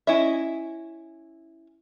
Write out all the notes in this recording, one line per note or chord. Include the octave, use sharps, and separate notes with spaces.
C#4 E4 D#5 E5